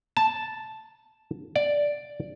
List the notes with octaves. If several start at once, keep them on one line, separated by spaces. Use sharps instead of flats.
A5
D5